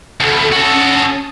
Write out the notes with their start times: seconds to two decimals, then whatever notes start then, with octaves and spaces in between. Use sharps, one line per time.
0.20 D2 B2 A4 B5
0.52 C#4 F#4 A4 A5 D#6